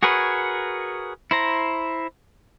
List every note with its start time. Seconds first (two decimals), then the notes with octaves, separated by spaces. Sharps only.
0.03 F#4 G#4 A#4 B4 C#5
1.31 E4 C5 A#5